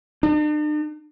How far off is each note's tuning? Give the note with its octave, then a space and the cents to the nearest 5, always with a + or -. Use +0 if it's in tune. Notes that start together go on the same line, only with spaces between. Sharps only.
D4 +45